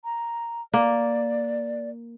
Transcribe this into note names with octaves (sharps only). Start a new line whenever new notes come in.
A#5
A#3 D5